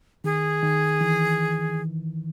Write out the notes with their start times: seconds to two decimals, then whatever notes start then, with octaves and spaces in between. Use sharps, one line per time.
0.24 D#3 G#4
0.63 D#3
1.01 E3